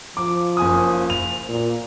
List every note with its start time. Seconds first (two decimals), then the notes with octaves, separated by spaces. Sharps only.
0.17 F3 D6
0.57 F#1 G#5 D#6
1.10 F7
1.49 A#2